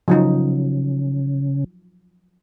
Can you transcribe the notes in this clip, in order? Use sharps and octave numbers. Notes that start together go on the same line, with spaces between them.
C#3 F3 F#3 D#4